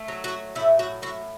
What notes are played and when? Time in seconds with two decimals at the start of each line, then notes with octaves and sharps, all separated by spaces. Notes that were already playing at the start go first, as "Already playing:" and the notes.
Already playing: A3
0.08 F#3
0.24 F#4
0.55 A2 E4
0.79 F#4
1.02 A2 F#4